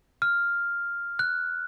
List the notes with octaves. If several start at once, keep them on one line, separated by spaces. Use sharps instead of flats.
F6
F#6